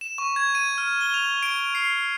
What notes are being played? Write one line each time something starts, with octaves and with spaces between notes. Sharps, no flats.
E7
C#6
G#6
D#7
F6
G7
F7
D7
C7